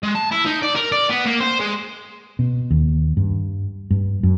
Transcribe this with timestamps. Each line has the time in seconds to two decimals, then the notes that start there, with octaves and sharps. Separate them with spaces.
0.03 G#3
0.15 A5
0.32 E4
0.46 D#4
0.63 D5
0.76 A#4
0.92 D5
1.09 B3
1.25 A#3
1.40 C5
1.60 G#3
2.39 B2
2.71 D#2
3.17 G2
3.91 G2
4.23 F#2